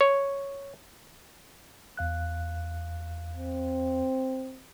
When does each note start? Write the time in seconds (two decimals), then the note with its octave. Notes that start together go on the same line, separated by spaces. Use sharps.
0.01 C#5
1.97 E2 F5 F#6
3.36 C4